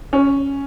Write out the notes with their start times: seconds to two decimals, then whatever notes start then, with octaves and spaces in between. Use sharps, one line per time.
0.13 C#4